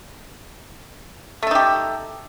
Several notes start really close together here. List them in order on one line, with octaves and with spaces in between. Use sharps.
A3 A4 D#4 G4